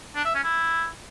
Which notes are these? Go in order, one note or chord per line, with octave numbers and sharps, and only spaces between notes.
D4
E5
C#4
E4